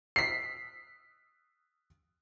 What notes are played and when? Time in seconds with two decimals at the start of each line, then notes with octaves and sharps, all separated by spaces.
0.16 B6 C7